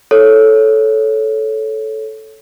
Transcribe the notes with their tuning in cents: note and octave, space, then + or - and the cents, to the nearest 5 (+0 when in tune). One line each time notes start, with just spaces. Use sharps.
A4 -10 C#5 +0